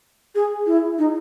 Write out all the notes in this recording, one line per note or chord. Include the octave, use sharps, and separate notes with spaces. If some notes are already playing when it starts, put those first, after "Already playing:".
G#4
E4
D#4